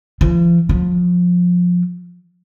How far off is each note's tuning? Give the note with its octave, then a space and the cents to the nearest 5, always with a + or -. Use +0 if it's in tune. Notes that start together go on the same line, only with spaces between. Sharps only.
F3 -40
F3 +25